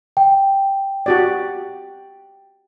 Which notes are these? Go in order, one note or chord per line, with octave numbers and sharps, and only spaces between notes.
G5
F#4 G4 D5